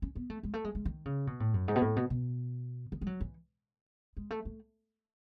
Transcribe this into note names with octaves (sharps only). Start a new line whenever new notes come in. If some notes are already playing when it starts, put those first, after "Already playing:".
C#4
B3
A3
G#3
A3
G#3
G#3
D#3
C#3
B2
A2
F#2
G#2
B2
A2
B2
B2
D#3
G#3
F#3
E3
G#3
A3
A3